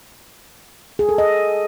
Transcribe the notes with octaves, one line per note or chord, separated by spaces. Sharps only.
G#4
A4
D#5